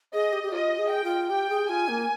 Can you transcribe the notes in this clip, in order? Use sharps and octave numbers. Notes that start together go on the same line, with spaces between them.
G#4 D#5
G4
G4
F4 D#5
G#4
G5
F4
G4 G5
G#4
F4 G#5
A#3